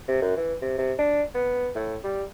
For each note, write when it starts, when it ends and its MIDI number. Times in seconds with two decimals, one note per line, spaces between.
0.08 0.20 48
0.21 0.36 42
0.37 0.54 52
0.61 0.75 48
0.78 0.93 48
0.98 1.22 62
1.35 1.69 59
1.75 1.96 45
2.03 2.23 55